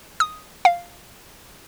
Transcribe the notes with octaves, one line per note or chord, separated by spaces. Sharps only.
D#6
F5